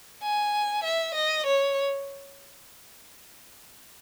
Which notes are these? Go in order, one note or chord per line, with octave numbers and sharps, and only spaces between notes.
G#5
E5
D#5
C#5